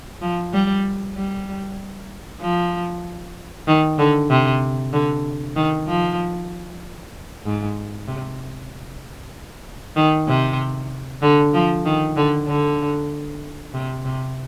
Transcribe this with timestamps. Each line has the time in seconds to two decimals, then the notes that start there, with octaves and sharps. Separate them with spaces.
0.22 F3
0.53 G3
1.15 G3
2.41 F3
3.68 D#3
3.99 D3
4.30 C3
4.93 D3
5.56 D#3
5.87 F3
7.45 G#2
8.08 C3
9.96 D#3
10.28 C3
11.22 D3
11.54 F3
11.85 D#3
12.17 D3
12.48 D3
13.74 C3
14.05 C3